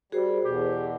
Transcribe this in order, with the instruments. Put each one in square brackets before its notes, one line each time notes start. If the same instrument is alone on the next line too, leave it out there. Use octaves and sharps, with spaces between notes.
[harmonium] G3 [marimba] F#4 [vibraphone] G#4 A#4 C5
[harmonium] E2 B2 [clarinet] G4